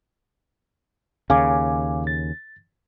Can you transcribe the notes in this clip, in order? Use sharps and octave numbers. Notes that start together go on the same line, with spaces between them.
D#2 C#3 F5 G#5 D6
A6